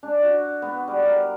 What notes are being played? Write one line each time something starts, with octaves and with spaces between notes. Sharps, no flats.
D4
F#4
B3
G3
A#4